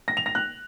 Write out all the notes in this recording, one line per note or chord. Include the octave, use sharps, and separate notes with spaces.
A#6
F7
A#6
F#6